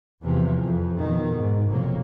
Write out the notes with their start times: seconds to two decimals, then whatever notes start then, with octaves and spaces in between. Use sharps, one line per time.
0.23 E2 C3 E3 F3
0.61 F2
0.98 F2 B2 D#3
1.36 G#2
1.68 F1 F2 B2 F#3 A#3